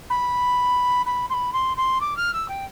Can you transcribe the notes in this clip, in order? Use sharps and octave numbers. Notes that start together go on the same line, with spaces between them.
B5
B5
C6
B5
C6
C6
D6
F6
E6
G5